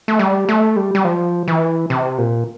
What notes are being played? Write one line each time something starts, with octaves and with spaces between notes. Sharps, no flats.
A3
G3
A3
G3
G3
F3
E3
C3
A#2